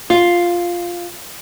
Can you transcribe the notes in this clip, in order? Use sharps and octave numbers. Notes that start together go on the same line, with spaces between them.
F4